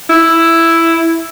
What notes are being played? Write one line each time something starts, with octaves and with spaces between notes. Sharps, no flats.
E4